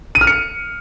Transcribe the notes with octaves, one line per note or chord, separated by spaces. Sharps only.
D#7
F6
C#7